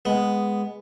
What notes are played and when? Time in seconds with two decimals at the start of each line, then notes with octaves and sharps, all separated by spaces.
0.05 G#3 B3